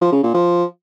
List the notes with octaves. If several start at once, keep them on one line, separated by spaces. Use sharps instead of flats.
F3
C#3
A#2
F3